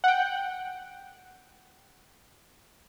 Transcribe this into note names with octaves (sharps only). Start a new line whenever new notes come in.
F#5 G5